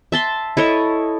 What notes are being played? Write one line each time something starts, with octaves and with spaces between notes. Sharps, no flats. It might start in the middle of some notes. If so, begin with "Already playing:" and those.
E5 A5 C6
E4 A4 C#5 D#5